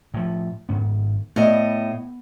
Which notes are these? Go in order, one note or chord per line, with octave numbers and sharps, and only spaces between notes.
A2 F3
G#1 G#2 B3
A2 B3 D#5